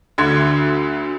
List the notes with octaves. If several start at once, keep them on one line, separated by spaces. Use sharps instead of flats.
D2 D3 C6 G#6